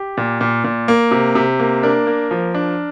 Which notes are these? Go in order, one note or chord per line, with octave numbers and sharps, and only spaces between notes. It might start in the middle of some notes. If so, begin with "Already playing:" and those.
Already playing: G4
A#2
A#2
A#2
A#3
C3
C3
A#3
D4 A#4
A#3
F3
D4